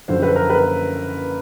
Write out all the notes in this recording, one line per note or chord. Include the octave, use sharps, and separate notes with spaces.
F#1 F#2 D3 F3 C5
B4
A#4
B4